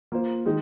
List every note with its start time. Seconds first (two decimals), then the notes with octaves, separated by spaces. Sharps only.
0.12 A#3 F4 C5
0.46 D#3 G#3 D#4 G#4